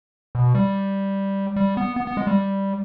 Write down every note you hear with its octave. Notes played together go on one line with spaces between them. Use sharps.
B2
G3
G3
B3
B3
B3
G#3
G3